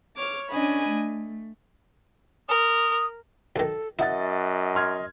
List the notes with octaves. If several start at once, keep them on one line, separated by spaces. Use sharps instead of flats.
C#5 D6 F6
C#4 D4 D#5 G#5 B5
A3
A#4 D#6
B1 D#3 A4
F#2 E4 D#5 E5 F#5 A6
C6 F6 G#6